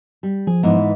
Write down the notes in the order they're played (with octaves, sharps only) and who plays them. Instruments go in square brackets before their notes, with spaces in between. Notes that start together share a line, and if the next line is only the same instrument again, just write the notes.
[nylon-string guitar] G3
[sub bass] F3 [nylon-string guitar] G#4
[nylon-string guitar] G#2 E3 B3